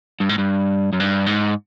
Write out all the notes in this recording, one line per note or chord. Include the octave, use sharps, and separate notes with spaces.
G2
G#2
G2
F#2
G2
G#2